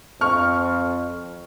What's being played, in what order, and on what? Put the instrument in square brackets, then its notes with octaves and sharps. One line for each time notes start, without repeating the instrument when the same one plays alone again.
[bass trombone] F2 [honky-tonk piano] C#6 F6